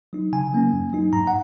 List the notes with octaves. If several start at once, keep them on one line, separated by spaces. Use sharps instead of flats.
F#3 D#4
C#3 G#5
F#3 A#3 C#4
F#2
F#3 D#4
G#2 A#5
F#5